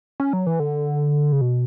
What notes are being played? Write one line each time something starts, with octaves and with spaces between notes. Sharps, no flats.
C#4
F#3
E3
D3
C#3
B2